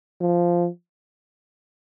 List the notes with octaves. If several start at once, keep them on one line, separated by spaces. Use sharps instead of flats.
F3